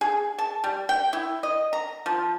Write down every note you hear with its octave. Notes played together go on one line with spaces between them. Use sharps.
G#4
A5
G3
G5
E4
D#5
A#5
F3